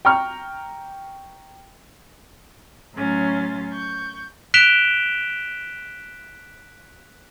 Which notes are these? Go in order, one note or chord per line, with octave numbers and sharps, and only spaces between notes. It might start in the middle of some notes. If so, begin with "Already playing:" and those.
G5 A#5 C#6 F6
A2 F#3 C#4 C6 A6
C#6 G6
F#6 B6 D7 E7 F7 G7